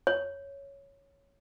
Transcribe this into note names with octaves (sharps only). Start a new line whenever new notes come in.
C#5